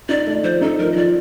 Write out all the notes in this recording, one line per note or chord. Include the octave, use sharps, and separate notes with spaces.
D#4 D5
A3
F3 C5
D#4 A4
F3 A#4
D#5
F3 D5